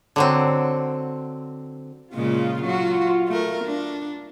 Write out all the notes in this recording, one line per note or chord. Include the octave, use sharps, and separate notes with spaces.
D3 F#3 C4
A#2 C#3 G#3 F4
F#3 F#4
A3 A#4
D4